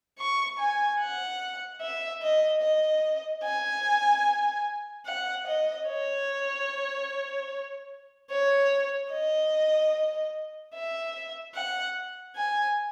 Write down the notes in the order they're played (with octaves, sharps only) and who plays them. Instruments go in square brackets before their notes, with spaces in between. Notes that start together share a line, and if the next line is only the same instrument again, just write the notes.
[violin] C#6
G#5
F#5
E5
D#5
D#5
G#5
F#5
D#5
C#5
C#5
D#5
E5
F#5
G#5